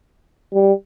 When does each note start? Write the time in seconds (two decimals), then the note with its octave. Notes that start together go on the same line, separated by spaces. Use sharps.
0.54 G3